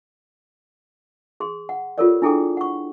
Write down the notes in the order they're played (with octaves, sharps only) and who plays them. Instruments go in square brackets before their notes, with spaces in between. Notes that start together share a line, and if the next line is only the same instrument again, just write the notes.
[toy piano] G#4 C6
F#5
F4 G4 A4 A#4 C#5 D5
D4 E4 G#4 A4 G5 D6
F#5 C#6